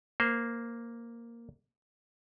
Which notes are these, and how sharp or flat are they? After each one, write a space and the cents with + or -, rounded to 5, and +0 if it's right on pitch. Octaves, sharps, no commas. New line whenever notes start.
A#3 +0 C5 -10